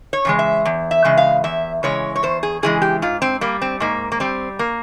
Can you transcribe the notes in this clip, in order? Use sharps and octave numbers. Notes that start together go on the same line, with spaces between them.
C#5
C#3 E3 G#3
E5
E2
E5
C#3 E3 G#3
F5
E2 E5
C#3 E3 G#3 C#5
C#5
E2 C5
G#4
C#3 E3 G#3 G#4
G4
G#2 F4
C4
G3 A#3
C4
G#2 A#3
A#3
G3 C4
A#3